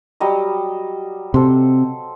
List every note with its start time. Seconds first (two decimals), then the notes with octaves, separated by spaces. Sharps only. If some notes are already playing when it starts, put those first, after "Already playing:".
0.20 F#3 G3 D#5
1.34 C3 A4 C5